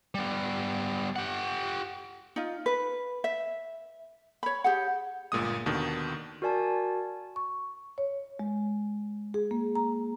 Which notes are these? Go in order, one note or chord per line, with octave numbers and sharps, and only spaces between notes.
G3 B3
G4 F#5
D#4 F4
B4
E5
C#5 B5
G4 G#4 F#5
G1 A#2 G#3 D#6
D#2 B2 D3 D#3
F#4 A#4 D5 G#5 A5
C#6
C#5
G#3
G#4
A#3
A#5